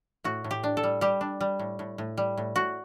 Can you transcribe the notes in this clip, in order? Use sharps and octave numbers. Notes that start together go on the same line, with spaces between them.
A2 F#4
A2
G4
D4
A4
G3
G3 G4
D4
G3
A2
A2
A2
G3
A2
A2 F#4